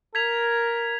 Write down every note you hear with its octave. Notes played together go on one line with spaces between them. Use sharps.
A#4 G#6 B6 F7